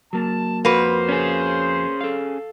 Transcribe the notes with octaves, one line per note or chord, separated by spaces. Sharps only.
F#3 A#3 A5
F2 A#3 F#4 B4 C5 F#5
C#4 G#4
A4 F5